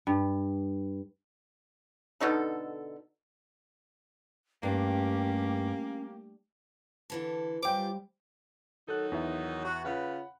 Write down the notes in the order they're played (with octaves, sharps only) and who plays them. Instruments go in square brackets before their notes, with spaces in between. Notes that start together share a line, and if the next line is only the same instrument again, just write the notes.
[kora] G2
[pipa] B2 D3 D#4 A4
[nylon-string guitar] G2 [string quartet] A3 G4 [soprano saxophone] A#3 [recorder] C#4
[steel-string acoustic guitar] D3 E3 A4
[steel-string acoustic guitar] F#2 F4 [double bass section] G3 [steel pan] C5 G5 [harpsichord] D6
[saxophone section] D#3 F#3 D#4 [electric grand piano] A4 F#6
[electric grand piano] E2 E5
[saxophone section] F#4
[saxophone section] C#3 F4 B4 [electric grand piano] F#5 B5